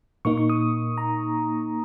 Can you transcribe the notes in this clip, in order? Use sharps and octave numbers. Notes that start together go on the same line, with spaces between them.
A#2 A#3 D#4 C#6
C#6
D#6
A#5